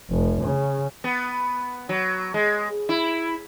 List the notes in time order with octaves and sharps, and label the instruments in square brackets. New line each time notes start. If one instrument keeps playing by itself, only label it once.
[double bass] F1
C#3
[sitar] B3
F#3
G#3
E4